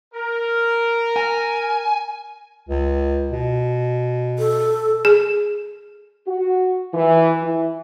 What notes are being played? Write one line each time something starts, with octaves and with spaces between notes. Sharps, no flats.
A#4
G#5
C#2
B2
A4
G#4
F#4
E3
E3